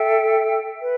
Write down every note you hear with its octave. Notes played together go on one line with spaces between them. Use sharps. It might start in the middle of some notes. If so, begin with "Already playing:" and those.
Already playing: A4 E5 G5
B4